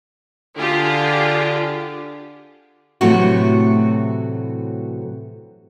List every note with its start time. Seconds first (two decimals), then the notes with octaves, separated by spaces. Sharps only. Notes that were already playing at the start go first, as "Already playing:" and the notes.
0.58 D3 F4 G4 G#4
3.01 A2 C3 E3 F#3 A3 F#4